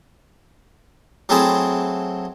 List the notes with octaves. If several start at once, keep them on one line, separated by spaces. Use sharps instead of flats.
F#3 A3 C4 E4 G#4